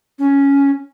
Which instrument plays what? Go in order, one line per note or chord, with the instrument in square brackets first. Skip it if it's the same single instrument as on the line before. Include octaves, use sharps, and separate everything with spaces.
[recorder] C#4